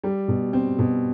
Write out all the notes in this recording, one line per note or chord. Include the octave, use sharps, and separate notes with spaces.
G3
B2
C4
B2